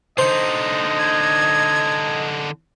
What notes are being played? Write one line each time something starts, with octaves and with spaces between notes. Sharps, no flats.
D3 D#4 C5 D#5
G#6